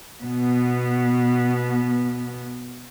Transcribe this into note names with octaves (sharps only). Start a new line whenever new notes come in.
B2 B3